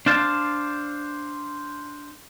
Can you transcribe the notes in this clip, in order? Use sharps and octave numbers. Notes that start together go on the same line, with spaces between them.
D4 C5 F5 A5